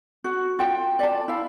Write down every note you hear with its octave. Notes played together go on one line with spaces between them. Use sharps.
F#4
F4 G5
D5 A5
E4 F5